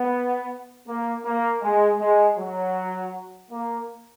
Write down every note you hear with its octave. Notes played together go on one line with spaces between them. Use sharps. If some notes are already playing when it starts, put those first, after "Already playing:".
Already playing: B3
A#3
A#3
G#3
G#3
F#3
A#3